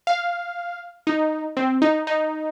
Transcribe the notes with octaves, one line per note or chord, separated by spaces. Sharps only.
F5
D#4
C4
D#4
D#4